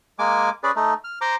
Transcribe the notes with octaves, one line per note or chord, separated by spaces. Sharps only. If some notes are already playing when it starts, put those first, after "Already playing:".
G#3 A#3 G#5 D6
C#4 G#4 B4 D5
A3 D#4
F6
C5 A#5 C6 D6